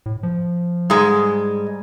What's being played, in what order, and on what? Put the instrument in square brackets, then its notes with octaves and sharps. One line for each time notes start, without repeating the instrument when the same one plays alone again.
[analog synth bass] A2
F3
[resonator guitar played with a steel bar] G#2 G#3 [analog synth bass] G3